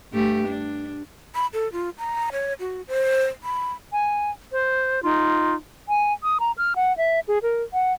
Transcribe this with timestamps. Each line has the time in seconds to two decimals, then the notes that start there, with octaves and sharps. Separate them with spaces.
0.13 G2 A3 G4
0.47 D4
1.35 B5
1.53 A4
1.72 F4
1.98 A#5
2.32 C#5
2.60 F#4
2.88 C5
3.43 B5
3.92 G#5
4.51 C5
5.02 D#4 F4
5.89 G#5
6.23 D#6
6.40 A#5
6.58 F6
6.76 F#5
6.97 E5
7.28 G#4
7.43 A#4
7.73 F#5